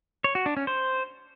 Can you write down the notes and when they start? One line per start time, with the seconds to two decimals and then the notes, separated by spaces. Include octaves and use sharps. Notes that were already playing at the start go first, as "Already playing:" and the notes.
0.24 C#5
0.35 F#4
0.46 D4
0.57 C#4
0.67 C5